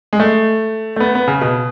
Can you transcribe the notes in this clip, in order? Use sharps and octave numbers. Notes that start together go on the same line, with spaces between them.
G#3
A3
A3
B3
B3
C#3
B2